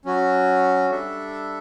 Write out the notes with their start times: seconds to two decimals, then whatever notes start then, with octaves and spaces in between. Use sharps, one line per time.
0.05 F#3 C#4 F#4
0.91 G3 D4 A4 E5